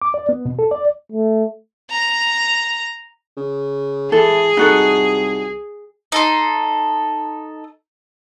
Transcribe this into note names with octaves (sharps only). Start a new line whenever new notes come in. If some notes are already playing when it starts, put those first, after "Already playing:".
D6
D5
B3
B2
A4
D5
A3
A#5
C#3
E3 G#4 A4
C2 D#4 F#4 A4
D#4 A4 C6